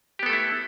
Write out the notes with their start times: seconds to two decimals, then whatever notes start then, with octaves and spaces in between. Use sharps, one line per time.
0.19 G4
0.23 B3
0.26 A4
0.30 A3
0.33 E4